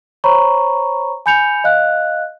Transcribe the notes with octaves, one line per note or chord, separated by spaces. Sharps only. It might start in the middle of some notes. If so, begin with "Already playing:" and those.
C5 C#5 A#5 B5 C#6
G#5 B5 G6 C#7 F7
D#5 F5 F#6